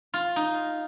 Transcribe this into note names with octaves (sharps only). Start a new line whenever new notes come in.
F4
D#4